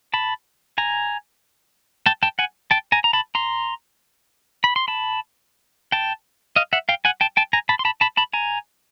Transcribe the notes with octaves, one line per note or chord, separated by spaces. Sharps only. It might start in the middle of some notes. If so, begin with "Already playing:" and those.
A5 B5
G#5 A#5
G5 A5
G5 A5
F#5 G#5
G5 A5
G#5 A#5
A#5
A5 B5
A#5 C6
B5
C6
A5 B5
G5 A5
D#5 F5
E5 F#5
F5 G5
F#5 G#5
G5 A5
G5 A5
G#5 A#5
A5 B5
C6
A5 B5
A5 B5
A5 B5
G#5 A#5